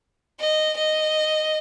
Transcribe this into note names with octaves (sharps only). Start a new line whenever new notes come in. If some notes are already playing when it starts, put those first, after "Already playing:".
D#5
D#5